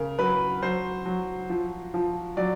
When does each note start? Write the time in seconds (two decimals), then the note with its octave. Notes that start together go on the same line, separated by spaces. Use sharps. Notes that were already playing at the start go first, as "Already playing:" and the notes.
Already playing: C#3 A#4
0.18 F#3 B4
0.62 F#3 C5
1.06 F#3
1.50 F3
1.94 F3
2.37 F#3 D5